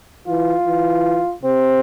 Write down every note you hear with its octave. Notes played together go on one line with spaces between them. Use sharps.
E3 F4
E3
C3 C4